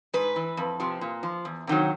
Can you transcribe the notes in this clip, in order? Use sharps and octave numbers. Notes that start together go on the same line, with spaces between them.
G#2 B4
E3
F2
C3 F3
A#2
F3
E2
C3 D#3 F#3